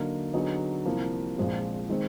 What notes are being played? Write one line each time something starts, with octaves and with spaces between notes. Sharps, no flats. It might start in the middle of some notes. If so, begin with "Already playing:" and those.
Already playing: D3 F#3 A#3 D#4
D3 F#3 B3 D#4 G#4
C2 C3 F3 A#3
A#1 A#2 F3 G#3 C4
D#3 G#3 C4